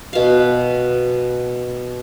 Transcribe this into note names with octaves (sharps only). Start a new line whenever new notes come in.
B2 F5